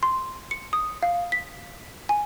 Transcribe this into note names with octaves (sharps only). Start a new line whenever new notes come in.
C6
C#7
D#6
F5
B6
G#5